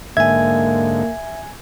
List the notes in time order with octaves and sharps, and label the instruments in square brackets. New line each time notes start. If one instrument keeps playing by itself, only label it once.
[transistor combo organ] G#2 D3 [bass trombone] A#3 [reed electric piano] E5 [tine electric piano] G#5 G#6